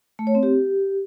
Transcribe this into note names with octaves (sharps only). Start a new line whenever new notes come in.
A3
C#5
C4
G4